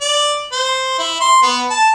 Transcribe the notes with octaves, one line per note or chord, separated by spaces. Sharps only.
D5
C5
E4
C6
B3
A5